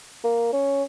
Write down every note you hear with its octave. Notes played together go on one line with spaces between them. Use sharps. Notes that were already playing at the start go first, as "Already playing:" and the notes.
A#3
C#4